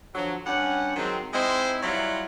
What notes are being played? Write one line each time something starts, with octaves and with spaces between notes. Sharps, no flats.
D3 F3 F#3
G2 C#4 F#5
D#3 F#3 G#3 C4
G#3 C4 D#4 E4 C5
F#3 G3 E4 F4 F#5